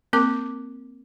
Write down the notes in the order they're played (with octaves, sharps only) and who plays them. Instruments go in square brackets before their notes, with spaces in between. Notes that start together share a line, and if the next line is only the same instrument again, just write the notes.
[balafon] A#3 C4 A#4 D6